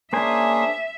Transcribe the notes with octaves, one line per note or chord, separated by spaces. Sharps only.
A#3 C#4 D4 G#4 C5 E5 G#5